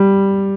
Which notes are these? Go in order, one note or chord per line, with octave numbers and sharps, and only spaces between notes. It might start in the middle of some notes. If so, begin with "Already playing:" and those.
Already playing: G3